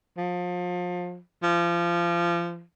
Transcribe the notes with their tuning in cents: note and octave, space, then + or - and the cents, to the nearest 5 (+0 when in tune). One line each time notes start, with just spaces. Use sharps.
F3 +30
F3 -25